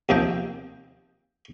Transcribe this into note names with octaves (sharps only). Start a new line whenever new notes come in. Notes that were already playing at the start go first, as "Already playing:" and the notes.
D#2 C3 F3 D#5 G5